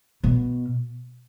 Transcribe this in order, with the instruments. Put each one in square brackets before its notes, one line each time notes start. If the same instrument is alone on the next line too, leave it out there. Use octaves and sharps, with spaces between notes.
[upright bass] B2